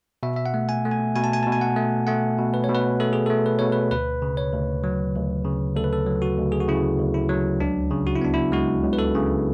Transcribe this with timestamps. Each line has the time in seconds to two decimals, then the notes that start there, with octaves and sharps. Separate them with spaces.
0.23 B2 E5
0.36 E5
0.46 F#5
0.54 A3
0.69 G#5
0.85 A3
0.91 G#5
1.15 B2 G#5
1.24 A5
1.33 G#5
1.43 B2 A5
1.52 G#5
1.61 F#5
1.76 A3
2.07 A3 F#5
2.38 B2
2.54 B4
2.64 B2 C#5
2.75 B4
3.00 A3 A4
3.13 G#4
3.26 A3 A4
3.46 B4
3.59 B2 C#5
3.72 B4
3.91 D2 B4
4.22 C#3
4.37 C#5
4.53 D2
4.84 F#3
5.15 D2
5.45 C#3
5.76 D2 A4
5.84 B4
5.93 A4
6.06 F#3
6.22 F#4
6.38 D2
6.52 G#4
6.60 F#4
6.68 C#3 E4
6.99 D2
7.14 E4
7.29 F#3
7.60 C#2 D4
7.91 C#3
8.07 F#4
8.16 E4
8.21 B3 D4
8.34 E4
8.52 G#3 F#4
8.83 C#2
8.93 B4
8.99 A4
9.15 C#3